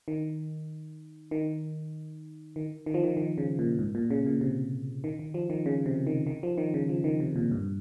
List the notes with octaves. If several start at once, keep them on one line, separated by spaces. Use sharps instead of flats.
D#3
D#3
D#3
D#3
F3
D#3
D#3
C#3
A#2
G#2
A#2
C#3
A#2
C3
D#3
D#3
F3
D#3
C#3
C3
D#3
D#3
F3
D#3
C#3
F3
D#3
C3
A#2
G2